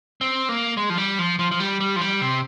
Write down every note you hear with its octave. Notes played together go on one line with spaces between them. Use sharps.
C4
A#3
G#3
F3
G3
F3
F3
F3
G3
G3
F3
G3
C3